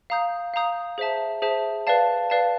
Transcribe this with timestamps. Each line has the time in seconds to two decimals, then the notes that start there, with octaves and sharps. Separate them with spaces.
0.10 F5 A#5 D#6 G6
0.54 F5 A#5 D#6 G6
0.98 G#4 C5 E5 A5
1.42 G#4 C5 E5 A5
1.87 B4 D5 F5 A5
2.30 B4 D5 F5 A5